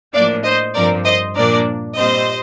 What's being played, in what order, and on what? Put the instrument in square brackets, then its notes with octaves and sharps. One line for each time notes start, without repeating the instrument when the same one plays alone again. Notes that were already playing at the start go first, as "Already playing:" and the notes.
[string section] A2 F3 A#3 D4 D5 F5
C5 D#5
G2 F3 C4 A#4 D5
C5 D#5
A#2 F3 A#3 D4 A#4 D5
A#2 G3 C4 C5 D#5